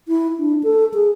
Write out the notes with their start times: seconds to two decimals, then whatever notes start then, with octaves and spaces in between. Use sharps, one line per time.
0.08 E4
0.39 D4
0.63 A4
0.94 G#4